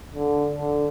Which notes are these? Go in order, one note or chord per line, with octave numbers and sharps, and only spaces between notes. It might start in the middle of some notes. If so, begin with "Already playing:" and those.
D3
D3